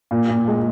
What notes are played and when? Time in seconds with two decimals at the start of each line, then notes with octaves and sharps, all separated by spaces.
0.11 A#2
0.29 A#2
0.48 G#3